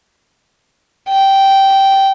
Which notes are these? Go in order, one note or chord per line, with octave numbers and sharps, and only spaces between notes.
G5